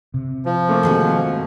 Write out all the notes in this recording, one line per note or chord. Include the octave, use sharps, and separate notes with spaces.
C3
F3
A3 A#3 C4
G#2 D#3 F#4